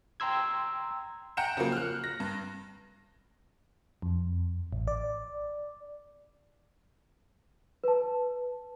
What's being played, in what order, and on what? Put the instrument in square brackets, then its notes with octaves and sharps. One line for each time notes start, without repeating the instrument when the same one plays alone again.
[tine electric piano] G5 A#5 C6 E6 G#6
[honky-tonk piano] F#5 G5 A#5 G6 C#7 E7
C#3 F3 F#3 A#3
F6 F#6
A#6
G2
[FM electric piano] F2
A1
D5
[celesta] B4 A5